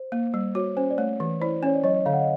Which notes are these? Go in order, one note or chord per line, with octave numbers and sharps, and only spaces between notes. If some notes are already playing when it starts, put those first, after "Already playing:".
Already playing: C5
A#3
G3
F#4 C#5
C#4 C5
D5
A3 C#5
E3
E4 C5 D5
C#4 C#5
D5
F#3 C#5 D#5
D3 F5
F#5
D#5